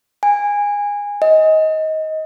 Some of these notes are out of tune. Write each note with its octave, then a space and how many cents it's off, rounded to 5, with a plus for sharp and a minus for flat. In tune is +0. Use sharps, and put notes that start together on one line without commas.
G#5 -20
D#5 +20